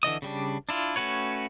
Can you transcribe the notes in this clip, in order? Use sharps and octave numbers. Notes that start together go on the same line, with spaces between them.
D3 E3 D#5 D#6
C#3 G3 D4
D4 E4 F4
A3 C#4 F#4 B4 C#5